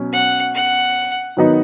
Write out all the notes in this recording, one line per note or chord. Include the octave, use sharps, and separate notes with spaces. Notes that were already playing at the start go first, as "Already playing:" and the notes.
Already playing: B2 F#3 C#4
F#5
F#5
D#3 F#3 B3 D#4